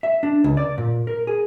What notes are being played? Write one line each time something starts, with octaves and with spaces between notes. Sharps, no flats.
E5
D4
C#2
D5
A#2
A#4
G#4